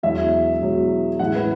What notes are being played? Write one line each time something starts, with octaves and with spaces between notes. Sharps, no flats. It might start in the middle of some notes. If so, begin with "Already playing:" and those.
E1 E2 B2 F#3 E5
E1 E2 B2 F#3
A1 A2 E3 G#3 F#5
B4